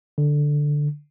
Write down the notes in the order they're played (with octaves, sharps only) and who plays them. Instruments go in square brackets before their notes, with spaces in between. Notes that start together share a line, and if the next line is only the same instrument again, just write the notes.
[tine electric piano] D3